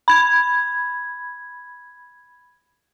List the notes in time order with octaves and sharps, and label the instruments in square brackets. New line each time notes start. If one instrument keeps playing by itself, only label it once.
[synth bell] B5 G#6